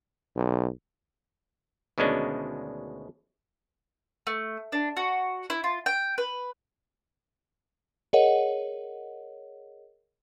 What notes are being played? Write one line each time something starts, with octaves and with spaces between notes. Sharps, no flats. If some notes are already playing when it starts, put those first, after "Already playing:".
B1
D2 B2 D#3 G#3 C#4 D4
A3
D4
F#4
E4
F4
G5
B4
G#4 A#4 C#5 D#5 F#5